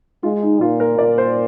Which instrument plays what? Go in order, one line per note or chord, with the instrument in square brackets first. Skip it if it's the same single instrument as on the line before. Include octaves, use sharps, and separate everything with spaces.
[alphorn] G#3 [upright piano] F4
[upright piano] D#4
[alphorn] A#2 [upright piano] F4
[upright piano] A#4
[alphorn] A#2 [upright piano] D5
[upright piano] C5